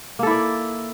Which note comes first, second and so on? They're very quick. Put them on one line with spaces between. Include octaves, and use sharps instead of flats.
A#3 A4 E4 D5